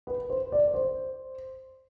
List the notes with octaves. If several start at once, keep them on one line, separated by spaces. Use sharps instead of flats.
B4
C5
D5
C5